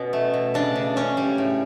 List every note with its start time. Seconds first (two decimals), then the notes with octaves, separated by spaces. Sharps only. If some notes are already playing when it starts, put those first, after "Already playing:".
Already playing: B2 B3 C#4
0.13 A3
0.34 B2
0.54 C#3 D4
0.76 C#3
0.96 C#3 C#4
1.17 G3
1.38 A2